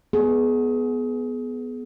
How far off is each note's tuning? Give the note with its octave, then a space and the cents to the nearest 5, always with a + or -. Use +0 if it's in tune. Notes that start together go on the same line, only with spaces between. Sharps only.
B3 +0 G#4 +25